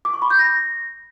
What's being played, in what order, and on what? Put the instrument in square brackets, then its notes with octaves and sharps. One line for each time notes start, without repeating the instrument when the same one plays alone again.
[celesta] D6
C#6
B5
G6
A#6